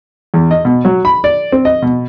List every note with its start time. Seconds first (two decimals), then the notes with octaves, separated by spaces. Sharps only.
0.34 E2
0.51 D#5
0.65 B2
0.85 F#3
1.05 B5
1.24 D5
1.52 C4
1.65 D#5
1.82 B2